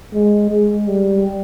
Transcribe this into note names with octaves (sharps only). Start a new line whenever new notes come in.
G#3
G#3
G3